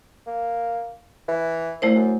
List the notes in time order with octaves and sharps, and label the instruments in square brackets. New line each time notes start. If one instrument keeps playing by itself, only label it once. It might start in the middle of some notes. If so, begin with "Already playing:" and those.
[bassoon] A#3
E3
[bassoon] A#2 [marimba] A3 E4 C5
[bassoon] F#2